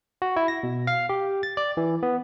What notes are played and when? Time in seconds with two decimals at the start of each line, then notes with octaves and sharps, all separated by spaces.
0.22 F#4
0.36 E4
0.48 A#6
0.63 B2
0.87 F5
1.09 G4
1.43 A6
1.57 D5
1.77 E3
2.03 B3